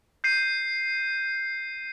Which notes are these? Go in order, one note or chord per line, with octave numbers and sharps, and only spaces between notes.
G6 C7 D#7